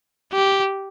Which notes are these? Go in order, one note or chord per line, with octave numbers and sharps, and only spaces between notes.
G4